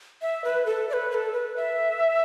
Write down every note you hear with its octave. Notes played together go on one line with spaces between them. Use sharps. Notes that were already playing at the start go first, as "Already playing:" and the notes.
E5
B4
A4
D5
B4
B4
A4
B4
E5